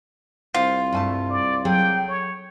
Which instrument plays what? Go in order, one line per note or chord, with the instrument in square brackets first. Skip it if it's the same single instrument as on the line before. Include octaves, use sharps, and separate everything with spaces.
[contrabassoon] C2 [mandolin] F4 [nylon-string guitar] C5
[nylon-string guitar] G2 G#5 A5 [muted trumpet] A3
[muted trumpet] D5
[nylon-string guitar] F#3 G#4 A4 [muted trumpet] G5
[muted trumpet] C#5